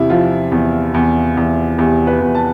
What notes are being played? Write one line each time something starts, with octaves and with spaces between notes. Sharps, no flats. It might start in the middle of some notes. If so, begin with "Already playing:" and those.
Already playing: E2 C3 E4 G4
F3 F4
E2
E2
E2
E2 G4
B4
E2
A5